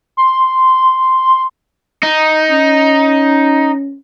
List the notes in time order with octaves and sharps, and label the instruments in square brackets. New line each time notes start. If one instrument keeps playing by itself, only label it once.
[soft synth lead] C6
[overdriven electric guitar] D#4
[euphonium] C#4